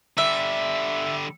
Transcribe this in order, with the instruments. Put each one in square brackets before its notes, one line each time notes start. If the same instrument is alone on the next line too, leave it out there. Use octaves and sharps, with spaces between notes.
[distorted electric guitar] D3 G3 [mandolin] E5